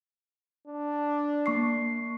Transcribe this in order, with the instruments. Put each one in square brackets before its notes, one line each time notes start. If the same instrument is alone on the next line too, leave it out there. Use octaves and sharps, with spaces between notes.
[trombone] D4
[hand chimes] A#3 C#6 C7